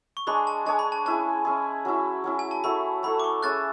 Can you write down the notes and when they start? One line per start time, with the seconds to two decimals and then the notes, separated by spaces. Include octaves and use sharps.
0.17 C#6
0.27 G#3 D4 G#4 C#5 B5
0.47 A5
0.66 G#3 D4 G#4 C#5 A5
0.79 B5
0.92 A5
1.05 C#4 E4 G#4 A5
1.45 C#4 E4 G#4
1.85 F#3 C#4 E4
2.24 F#3 C#4 E4
2.39 G#5
2.51 A5
2.64 F#3 A3 E4 A4 B5
3.03 F#3 A3 E4 A4 B5
3.20 D6
3.24 C#6
3.43 C#4 G#4 C#5 E5 F#6 A6